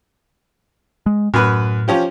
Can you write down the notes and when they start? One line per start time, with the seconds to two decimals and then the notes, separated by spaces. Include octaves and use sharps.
1.06 G#3
1.34 F#2 A2 B4
1.88 F3 C#4 G4